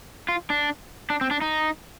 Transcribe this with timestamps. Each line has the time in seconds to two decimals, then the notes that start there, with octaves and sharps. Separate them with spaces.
0.29 F4
0.50 D4
1.10 D4
1.21 C4
1.31 D4
1.41 D#4